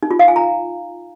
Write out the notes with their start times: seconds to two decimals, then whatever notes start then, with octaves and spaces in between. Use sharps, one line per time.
0.03 D#4
0.11 F4
0.19 F5
0.28 G#5
0.36 A#5